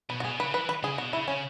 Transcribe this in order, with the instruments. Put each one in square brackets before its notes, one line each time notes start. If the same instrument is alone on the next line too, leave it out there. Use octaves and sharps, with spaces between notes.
[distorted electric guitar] B2 [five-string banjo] B4
[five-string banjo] F#4
[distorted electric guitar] B2 [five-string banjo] G#4
[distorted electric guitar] C#3 [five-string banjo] B4
[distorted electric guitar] E3 [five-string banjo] B4
[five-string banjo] B4
[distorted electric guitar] C#3 [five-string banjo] G#4
[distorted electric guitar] B2 [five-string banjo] F#4
[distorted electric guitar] C#3 [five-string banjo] E4
[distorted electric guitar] C#3 [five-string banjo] C#4